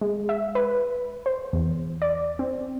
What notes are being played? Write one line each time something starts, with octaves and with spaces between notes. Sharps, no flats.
G#3
E5
B4
C5
E2
D5
C4